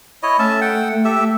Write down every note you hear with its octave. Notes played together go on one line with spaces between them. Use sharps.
E4 C#5 D#5
A3 C#4 E5 A5
F#5 G5
G4 A4 E5